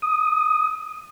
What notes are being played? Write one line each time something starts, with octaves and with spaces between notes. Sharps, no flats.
D#6